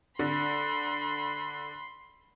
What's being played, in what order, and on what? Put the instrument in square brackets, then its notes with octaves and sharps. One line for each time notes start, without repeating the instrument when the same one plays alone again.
[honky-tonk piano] D3 [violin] B5 C6